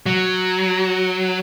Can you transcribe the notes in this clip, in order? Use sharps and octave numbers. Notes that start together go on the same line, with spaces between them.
F#3